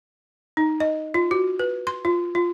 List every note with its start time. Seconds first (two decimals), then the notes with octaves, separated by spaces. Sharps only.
0.57 D#4
0.80 D#5
1.14 F4
1.31 F#4
1.59 B4
1.87 C6
2.05 F4
2.35 F4